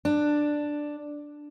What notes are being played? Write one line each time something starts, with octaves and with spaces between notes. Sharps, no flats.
D4